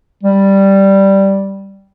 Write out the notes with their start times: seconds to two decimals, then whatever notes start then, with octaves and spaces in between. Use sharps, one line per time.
0.23 G3